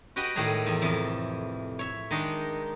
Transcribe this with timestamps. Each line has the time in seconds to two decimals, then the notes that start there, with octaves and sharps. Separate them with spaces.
0.16 F#4 G4 B4 D#5 F#5 G5
0.36 A2 D#3 G3 G#4 A#5
0.66 E2
0.82 F2 C3 E3
1.79 C#5 E5
2.11 D#3 G#3 D4 D#4